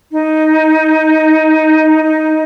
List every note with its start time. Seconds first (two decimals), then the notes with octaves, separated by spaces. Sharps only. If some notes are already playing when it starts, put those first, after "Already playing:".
0.12 D#4
2.04 D#4